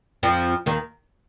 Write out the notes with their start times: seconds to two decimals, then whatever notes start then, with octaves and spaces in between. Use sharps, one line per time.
0.23 F2 F3
0.66 D#2 D#3